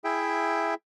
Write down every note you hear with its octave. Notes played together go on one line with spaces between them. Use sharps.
E4 G#4 E5 G5